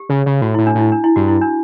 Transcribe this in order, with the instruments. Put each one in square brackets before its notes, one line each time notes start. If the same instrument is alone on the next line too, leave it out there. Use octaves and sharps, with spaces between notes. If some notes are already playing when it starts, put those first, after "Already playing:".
Already playing: [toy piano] G4
[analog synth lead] C#3
C#3
[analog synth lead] A2 [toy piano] F#4
[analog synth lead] A2 [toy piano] E4
[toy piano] D4
[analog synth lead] A2 [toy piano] E4
[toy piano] D4
E4
[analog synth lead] G2 [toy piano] F#4
[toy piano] E4
D4